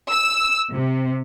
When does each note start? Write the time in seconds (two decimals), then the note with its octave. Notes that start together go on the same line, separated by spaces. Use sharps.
0.10 E6
0.73 C3